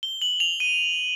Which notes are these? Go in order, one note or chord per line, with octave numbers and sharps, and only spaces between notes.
G7
F#7
F7
D#7